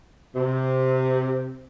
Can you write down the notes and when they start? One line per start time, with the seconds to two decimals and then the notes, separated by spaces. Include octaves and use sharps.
0.35 C3